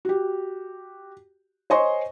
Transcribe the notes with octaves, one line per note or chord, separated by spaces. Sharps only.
F#4 G4
C5 C#5 D#5 G#5 C6 C#6